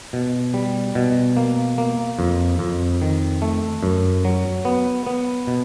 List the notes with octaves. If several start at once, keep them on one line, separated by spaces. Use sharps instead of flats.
B2
G3
B2
A#3
A#3
F2
F2
D#3
A3
F#2
F#3
B3
B3
B2